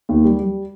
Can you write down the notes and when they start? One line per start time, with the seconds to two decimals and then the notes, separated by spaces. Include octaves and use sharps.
0.09 D#2
0.24 G3
0.39 G3